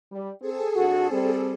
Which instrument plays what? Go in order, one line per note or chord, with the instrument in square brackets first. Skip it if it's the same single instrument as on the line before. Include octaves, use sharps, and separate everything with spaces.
[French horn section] G3
[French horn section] C4 [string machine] G#4 A4
[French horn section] F2 D4 F#4
G3 C4